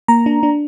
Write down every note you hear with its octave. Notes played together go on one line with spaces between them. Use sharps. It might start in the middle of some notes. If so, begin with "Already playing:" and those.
A#3 A#5
D4
D4